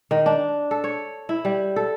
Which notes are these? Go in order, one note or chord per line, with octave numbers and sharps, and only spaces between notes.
D#3
D4
A4
C#5
E4
G3
A4